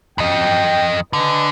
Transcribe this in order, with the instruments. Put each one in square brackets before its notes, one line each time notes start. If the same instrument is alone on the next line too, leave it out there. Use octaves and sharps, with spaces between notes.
[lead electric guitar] F2 D#5 [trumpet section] G5
[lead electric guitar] D3 [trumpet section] B4 D#5 G#5